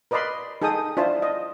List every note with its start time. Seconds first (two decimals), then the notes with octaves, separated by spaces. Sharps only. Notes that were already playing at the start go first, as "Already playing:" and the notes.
0.11 A#4 B4 D5 D#5 B5 C6
0.62 D#4 G#4 A4 G5 D#6
0.97 D4 E4 F4 C5 A5
1.22 D#5